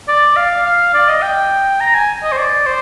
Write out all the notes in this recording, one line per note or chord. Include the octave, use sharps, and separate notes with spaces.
D5
F5
F5
D5
D#5
G5
A#5
G#5
D#5
C5
D5
C5